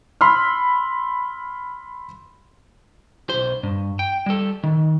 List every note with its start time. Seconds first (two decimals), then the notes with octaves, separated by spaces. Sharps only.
0.21 B5 C6 E6 F6
3.29 B1 C5
3.63 G2
3.99 G5
4.26 G3 A4
4.63 D#3